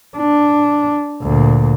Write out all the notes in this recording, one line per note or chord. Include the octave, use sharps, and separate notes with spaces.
D4
D2 A#2